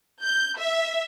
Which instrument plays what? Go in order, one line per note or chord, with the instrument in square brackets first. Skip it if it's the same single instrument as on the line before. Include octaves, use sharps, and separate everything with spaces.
[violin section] G6
E5